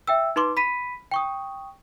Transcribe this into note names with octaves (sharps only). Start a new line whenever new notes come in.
E5 G5 E6
D#4 B4 C6 D6
B5 B6 D#7
G5 C#6 D#6